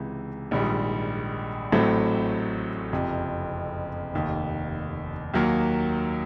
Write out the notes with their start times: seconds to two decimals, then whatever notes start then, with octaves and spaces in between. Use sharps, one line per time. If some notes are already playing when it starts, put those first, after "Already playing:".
Already playing: C#2 C3 E3
0.51 A#1 G#2 D#3 G3
1.72 A1 A2 F#3 A3 C4
2.92 F#1 F2 C3
4.14 F1 D#2 D#3
5.34 D#2 D#3 F#3 A#3